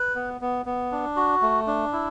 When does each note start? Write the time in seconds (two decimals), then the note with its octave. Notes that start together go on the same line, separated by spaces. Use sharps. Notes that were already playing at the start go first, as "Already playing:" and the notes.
Already playing: B4
0.15 B3
0.41 B3
0.66 B3
0.92 D4
1.16 F#4
1.41 A3
1.67 D4
1.92 E4